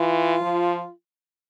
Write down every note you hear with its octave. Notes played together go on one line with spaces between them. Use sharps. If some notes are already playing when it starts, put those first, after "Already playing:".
Already playing: E3 F4
F3